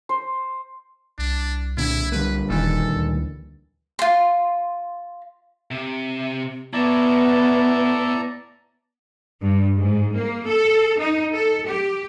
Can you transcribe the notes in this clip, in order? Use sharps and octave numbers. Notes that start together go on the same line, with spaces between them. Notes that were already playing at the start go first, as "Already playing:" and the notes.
C5
C2 D4
A#2 D3 E4
D3 G3 A#3 B4
E1 A#2 D#3 E3 A4
D2
F4 C6
C3
B3 E4 C#5 D5 A5 A#5
G2
G#2
A#3
A4
D#4
A4
G4